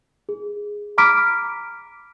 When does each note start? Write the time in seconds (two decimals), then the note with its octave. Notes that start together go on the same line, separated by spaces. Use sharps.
0.29 G#4
0.98 A#5 B5 D6 F6 B6 D7